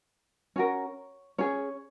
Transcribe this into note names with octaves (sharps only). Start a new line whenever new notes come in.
C#4 F#4 A#4 C#5
C#4 G#4 C#5